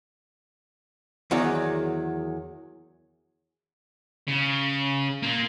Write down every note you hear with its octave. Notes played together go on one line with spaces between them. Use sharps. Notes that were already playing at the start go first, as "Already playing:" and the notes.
E2 D#3 F#3 G#4 D5
C#3
A#3 F4